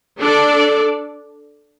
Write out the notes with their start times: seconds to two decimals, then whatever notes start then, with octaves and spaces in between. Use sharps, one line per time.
0.21 D4 A4 D5